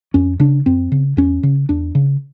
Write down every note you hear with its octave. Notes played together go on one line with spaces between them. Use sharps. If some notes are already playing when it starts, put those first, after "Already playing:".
F2 C#4
C#3 D4
F2 C4
C#3
E2 C#4
C#3
E2 D4
C#3